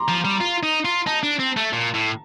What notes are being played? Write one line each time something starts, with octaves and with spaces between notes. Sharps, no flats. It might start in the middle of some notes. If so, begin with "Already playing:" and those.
Already playing: A#5 C6 D6
F3
G3
F4
D#4
F4
D#4 A5
D4
C4
A3
A#2
A2